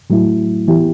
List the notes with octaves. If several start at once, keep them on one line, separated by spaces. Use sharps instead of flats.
A2 F#3 A3 E4
E3 B3 E4 G4